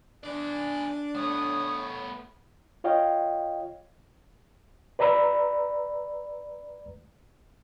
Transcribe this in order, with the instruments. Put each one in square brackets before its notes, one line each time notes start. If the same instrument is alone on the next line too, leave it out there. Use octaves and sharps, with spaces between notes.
[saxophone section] D4 [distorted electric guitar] G#4 D5
[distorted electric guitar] A3 B3 [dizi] C#5 [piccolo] D#6
[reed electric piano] F4 C#5 D#5 F5 G5
B4 D5 A#5 B5 E6